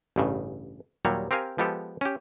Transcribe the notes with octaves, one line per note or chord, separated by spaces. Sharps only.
A1 G2 C#3
D#2 A#2 F#3 G3 C#5
C4 G4 A#4 F5 G#5
F3 G#3 B3 G4 A4
C#4 G4